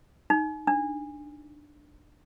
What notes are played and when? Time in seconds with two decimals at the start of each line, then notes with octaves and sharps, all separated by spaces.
0.30 D#4
0.67 D4